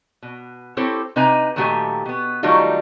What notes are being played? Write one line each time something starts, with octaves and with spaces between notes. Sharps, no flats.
B2
C4 E4 G4 A4 C5 C#5
C3 D#4 B4 G#5 A#5
A#2 D#3 F#3 A3 G4 G#5
B2 B3
D#3 F#3 G3 A3 D#4 F4